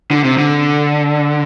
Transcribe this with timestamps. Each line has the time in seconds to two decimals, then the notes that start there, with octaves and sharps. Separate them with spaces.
0.11 D3
0.24 C3
0.38 D3